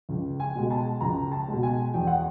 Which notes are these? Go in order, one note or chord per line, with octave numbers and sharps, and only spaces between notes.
C#2
G#5
B2 G#3
A5
C#2 A#5
A5
B2 G#3
G#5
E2 G5
F#5